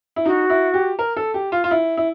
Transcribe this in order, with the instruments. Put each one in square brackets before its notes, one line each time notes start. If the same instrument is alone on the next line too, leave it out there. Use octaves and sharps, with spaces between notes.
[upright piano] E4
[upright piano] D#4 [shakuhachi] F#4
[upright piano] E4
G4
A#4
A4
G4
F4
F4
E4
E4